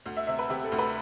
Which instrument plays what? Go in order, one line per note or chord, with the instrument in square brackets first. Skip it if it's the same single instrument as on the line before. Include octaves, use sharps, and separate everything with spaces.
[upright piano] D2
E5
C3 E5
B4
C3 G4
A4
D2
B4